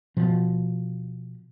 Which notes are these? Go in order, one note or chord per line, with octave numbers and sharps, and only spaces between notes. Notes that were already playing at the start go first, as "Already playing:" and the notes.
B2 F3